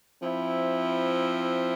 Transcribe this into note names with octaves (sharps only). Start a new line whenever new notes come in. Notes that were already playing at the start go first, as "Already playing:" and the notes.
F3 C4 E4